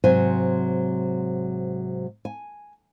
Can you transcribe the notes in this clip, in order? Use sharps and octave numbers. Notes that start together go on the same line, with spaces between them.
G#2 C3 F#3 C5 G#5
G#5